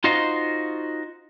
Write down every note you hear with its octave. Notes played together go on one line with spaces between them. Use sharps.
D#4 F4 F#4 C5 D#5 F5